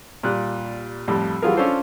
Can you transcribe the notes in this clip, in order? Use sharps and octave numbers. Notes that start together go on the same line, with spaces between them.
A#2 G3 F#6
F2 A2 G3
E3 F#3 G3 F4 G#4 A#4
C#4 D4 F4 A4 C5